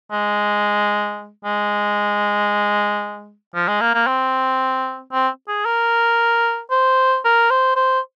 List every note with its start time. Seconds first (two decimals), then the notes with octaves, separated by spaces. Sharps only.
0.12 G#3
1.45 G#3
3.55 F3
3.68 G#3
3.81 A#3
3.94 A#3
4.07 C4
5.12 C4
5.48 G#4
5.65 A#4
6.71 C5
7.24 A#4
7.50 C5
7.76 C5